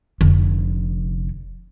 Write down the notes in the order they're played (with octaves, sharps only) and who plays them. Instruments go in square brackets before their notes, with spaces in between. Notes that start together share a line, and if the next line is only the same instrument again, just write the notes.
[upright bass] F1 D3